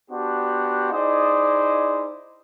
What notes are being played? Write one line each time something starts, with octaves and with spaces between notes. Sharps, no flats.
B3 D4 F#4 G4 C5 F#5
D#4 E4 G#4 C5 D5 D#5